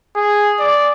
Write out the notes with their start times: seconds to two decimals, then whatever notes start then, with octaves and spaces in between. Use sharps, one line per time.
0.16 G#4
0.60 D5